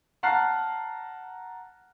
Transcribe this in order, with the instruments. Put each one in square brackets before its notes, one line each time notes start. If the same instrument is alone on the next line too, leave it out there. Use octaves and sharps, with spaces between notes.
[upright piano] F#5 A5 A#5 F6 F#6 C7